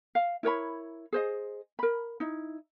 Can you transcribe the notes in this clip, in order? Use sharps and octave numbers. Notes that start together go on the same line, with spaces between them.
F5
E4 A#4 C#5 B5
G#4 C5 D#5
A#4 B5
D#4 E4